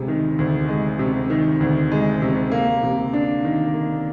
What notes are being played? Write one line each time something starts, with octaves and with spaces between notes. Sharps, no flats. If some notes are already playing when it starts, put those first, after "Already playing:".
Already playing: D2 C3 G#3
D#3
D2
G#3
C3
D#3
D2
G#3
C3
A#3
C3
D4
D#3
A#3